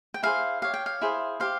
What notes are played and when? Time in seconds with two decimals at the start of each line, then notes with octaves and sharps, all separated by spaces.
0.14 G5
0.23 E4 G#4 C5 F5
0.62 G4 C#5 F5
0.74 G5
0.86 F5
1.01 E4 G#4 C5
1.40 G4 C5 F5